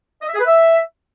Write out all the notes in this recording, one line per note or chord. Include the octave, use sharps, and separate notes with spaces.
D#5
E5
G#4
B4
E5